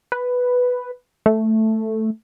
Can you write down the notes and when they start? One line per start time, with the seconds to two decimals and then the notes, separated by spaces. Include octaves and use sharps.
0.12 B4
1.26 A3